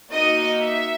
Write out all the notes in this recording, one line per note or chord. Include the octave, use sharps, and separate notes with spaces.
A#3 D#4 F#4 D#5
E5